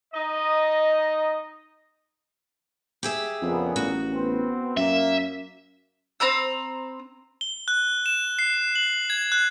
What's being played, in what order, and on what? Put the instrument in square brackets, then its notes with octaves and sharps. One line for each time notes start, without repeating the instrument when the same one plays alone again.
[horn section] D#4 D#5
[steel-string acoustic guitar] G4 G#4 E5
[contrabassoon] F2 [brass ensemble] A#2 C#3 B3
[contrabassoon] A1 [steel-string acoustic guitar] F#4
[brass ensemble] B3 C4
[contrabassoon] F#2 [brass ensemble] A#3 [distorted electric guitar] E5
[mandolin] C4 A#5 B5 E6
[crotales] G7
F#6
E7
C7
F#7
G#6
F#6